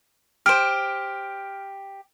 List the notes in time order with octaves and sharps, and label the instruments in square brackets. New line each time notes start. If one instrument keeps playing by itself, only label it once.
[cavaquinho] G4 C5 [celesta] F6 D7